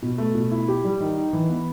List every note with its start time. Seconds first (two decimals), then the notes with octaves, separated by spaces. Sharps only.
0.02 B2
0.18 A3
0.35 B2
0.51 E4
0.68 G4
0.85 G3
1.00 D#3
1.17 D#4
1.33 E3
1.49 B3